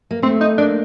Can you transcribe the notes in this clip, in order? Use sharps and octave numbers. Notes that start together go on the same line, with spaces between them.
A#3
A3 C4
D#4
A#3 D4